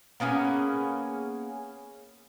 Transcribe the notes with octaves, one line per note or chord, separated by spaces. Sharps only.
A#3 B3 C#4 G#4